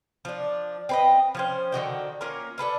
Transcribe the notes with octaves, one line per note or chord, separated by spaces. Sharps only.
F3 D4
C4 B4 D#5
F3 C#4 C5
D3 D#3 F#4 G5
A#3 C#4 F4 A#4
D4 A4 B4 F5